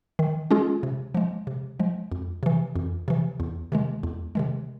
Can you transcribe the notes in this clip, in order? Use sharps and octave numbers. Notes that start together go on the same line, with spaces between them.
D#3
G#3 C#4 F4 G#4
C3
F3 G#3
C3
F3 G#3
F2
C3 E3
F2
C3 E3
E2
C3 D#3 G#3
E2
C3 D#3 G#3